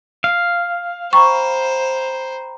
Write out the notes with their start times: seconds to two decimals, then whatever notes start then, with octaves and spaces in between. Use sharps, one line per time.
0.24 F5
1.13 C5 G5 A#5 B5 C#6